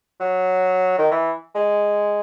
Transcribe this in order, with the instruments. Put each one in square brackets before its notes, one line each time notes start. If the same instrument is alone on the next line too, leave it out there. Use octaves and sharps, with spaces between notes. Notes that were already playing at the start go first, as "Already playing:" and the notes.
[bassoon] F#3
D#3
E3
G#3